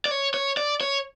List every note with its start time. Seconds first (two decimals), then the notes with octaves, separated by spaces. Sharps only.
0.06 D5
0.11 C#5
0.34 C#5
0.57 D5
0.81 C#5